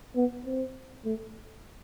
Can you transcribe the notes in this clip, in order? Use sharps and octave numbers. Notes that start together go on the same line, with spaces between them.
B3
C4
A3